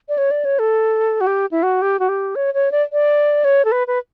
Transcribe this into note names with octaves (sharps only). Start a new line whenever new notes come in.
D5
C#5
D5
C#5
A4
F#4
G4
E4
F#4
G4
F#4
G4
C#5
C#5
D5
D5
C#5
A4
B4
B4